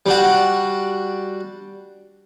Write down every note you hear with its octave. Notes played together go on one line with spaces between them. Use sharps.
G3 D4 F#4